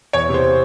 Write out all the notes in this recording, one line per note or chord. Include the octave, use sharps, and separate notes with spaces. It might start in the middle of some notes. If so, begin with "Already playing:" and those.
E2 C#5
C3 C5